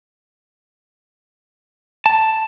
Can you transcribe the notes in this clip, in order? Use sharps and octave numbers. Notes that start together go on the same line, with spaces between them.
A5